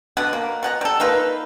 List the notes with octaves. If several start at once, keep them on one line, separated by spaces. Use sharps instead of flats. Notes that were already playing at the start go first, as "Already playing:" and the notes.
B2 D3 B4 F#5
A#3
B2 F#5 A#5
G3 A4
A#3 D#4 F4 B4